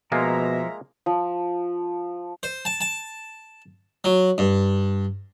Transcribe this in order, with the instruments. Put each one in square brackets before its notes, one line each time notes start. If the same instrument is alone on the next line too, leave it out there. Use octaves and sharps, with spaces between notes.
[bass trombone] B2 [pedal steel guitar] F3 [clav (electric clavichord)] G#3 A#3 F4 [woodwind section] E5 A#5
[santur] F3
[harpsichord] C5
A5
A5
F#3
G2